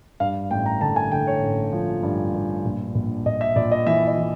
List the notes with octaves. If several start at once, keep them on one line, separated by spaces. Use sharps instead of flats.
G2 F5
A1 G5
A#5
D3 A5
G#5
D3 G5
C#5
A1
F3
G2
G2
A#1
A#1
A#1 D#5
E5
A#1 D5
D#5
E3 E5
D#5
E3